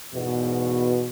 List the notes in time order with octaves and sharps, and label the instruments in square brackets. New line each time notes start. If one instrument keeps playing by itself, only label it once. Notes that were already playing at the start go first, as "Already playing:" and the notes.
[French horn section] E2 G#2 B2